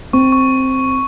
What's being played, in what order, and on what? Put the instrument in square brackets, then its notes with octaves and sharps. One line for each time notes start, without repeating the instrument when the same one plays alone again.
[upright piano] C4 [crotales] C#6
[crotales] C#6